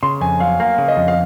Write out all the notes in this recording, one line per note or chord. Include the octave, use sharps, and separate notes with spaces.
C#3 C6
F2 G#5
F#3 F5
A#3 F5
C#3
D#5
F2
F5